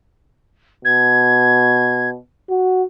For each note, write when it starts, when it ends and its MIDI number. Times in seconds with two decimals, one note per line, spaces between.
0.85 2.16 47
0.85 2.09 92
2.49 2.83 66